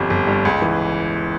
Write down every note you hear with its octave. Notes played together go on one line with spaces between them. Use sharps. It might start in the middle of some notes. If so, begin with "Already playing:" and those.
Already playing: G1 F2 G3
G1
G2
C#2
E3